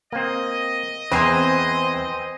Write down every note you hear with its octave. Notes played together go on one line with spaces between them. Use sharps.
A#3 C4 D#5
E2 C4 G#4 B4 C5 G#5 A#5